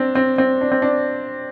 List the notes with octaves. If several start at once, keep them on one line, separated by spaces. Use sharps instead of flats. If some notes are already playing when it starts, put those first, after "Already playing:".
Already playing: C4 D4
C4
C4
D4
C4
D4